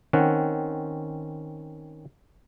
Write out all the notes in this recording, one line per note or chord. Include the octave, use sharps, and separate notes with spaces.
D#3 C4 C#4 F#5